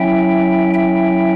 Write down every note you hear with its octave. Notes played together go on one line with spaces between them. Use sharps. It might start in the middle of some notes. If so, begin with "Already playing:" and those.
Already playing: F#3 C#4 E4 E5 G5
E5 G5